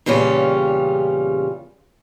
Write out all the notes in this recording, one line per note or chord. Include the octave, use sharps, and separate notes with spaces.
E2 A#2 C#3 G3 C#4 F4